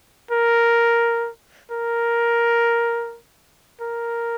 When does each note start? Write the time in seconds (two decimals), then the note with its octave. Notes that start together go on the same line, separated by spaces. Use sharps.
0.31 A#4
1.71 A#4
3.81 A#4